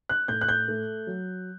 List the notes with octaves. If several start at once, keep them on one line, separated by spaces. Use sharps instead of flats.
F#6
A2 G6
F#6
G6
A3
F#3